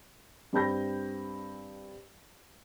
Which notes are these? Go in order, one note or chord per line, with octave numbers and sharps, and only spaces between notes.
G2 C4 B5 G6 A#6